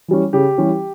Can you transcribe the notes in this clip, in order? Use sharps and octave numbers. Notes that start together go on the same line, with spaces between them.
E3 G3 C#4
C#3 G4
E3 G3 C#4